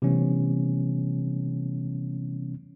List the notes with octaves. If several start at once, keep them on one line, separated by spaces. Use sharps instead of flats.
C3 E3 G3 A3 B3 C#4